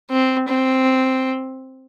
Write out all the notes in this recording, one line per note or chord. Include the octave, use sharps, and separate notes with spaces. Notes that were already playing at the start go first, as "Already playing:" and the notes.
C4
C4